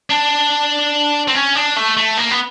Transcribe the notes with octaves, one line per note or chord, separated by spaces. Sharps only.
D4
C4
C#4
D4
A3
A3
A#3
B3